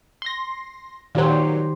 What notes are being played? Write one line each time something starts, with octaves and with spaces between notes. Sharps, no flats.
C6 A#6
A#2 D#3 F#3 G4 C5